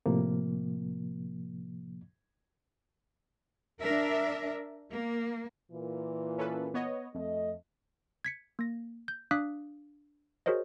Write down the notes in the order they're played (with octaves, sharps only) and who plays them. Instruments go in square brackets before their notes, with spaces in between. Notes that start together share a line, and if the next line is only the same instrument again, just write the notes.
[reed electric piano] A2 C3 F3 A#3
[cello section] D4 A#4 E5
A#3
[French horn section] A#2 E3
[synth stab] C#4 A4 B4
B3 C#5 D#5
[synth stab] F2 [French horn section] A3 D#5
[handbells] G#6 B6 C#7
A#3 A#6
G6
D4 F5 D6 D#6 F#6 B6
F#4 G#4 A#4 C5 C#5 D#5